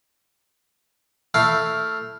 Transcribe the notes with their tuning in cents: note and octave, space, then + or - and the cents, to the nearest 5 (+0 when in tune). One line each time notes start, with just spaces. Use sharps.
A3 +10 E4 +0 F5 +0